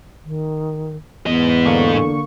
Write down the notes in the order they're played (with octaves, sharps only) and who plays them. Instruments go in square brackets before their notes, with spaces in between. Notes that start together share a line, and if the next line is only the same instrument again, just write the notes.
[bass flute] D#3
[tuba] E2 [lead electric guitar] G#2 D#5 [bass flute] B3
[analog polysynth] D3 A#3 C#6